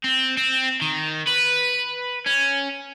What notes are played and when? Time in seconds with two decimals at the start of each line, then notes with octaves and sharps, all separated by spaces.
0.04 C4
0.37 C4
0.81 D#3
1.28 B4
2.26 C#4